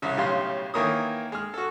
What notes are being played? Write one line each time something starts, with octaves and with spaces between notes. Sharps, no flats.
C2 C#3
B1 A2 C#3 G3 F5 C6
D#3 E3 A#3 C#5 D#6
G#3 F6
F#4 A4